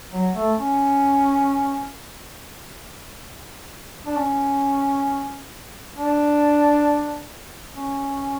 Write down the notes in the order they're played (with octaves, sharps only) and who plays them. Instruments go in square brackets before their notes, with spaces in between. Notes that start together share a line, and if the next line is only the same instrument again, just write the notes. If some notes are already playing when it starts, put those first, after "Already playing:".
[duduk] F#3
A3
C#4
D4
C#4
D4
C#4